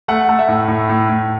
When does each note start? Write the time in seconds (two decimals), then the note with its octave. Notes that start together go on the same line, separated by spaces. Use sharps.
0.08 A3 F#5
0.29 A3
0.39 E5
0.48 A2
0.68 A2
0.89 A2
1.09 A2